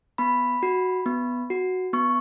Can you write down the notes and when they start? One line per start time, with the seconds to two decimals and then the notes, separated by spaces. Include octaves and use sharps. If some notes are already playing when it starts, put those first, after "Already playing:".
0.18 B3 B5
0.63 F#4
1.06 B3
1.50 F#4
1.93 B3 C#6